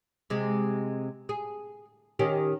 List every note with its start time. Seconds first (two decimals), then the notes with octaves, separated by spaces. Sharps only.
0.30 C3 G#3
1.29 G#4
2.19 D#3 C#4 G4